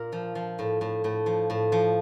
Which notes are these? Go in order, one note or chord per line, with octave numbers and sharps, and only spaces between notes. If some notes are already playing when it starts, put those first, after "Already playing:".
Already playing: A#2 A#4
F3
F3
A2
A2
A2
F3
A2
F3